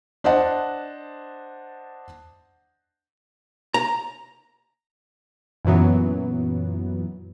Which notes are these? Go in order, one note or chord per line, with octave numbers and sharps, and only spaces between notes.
D4 C5 D#5 F#5 A5
A#5
F#2 A#2 E3 F#3 B3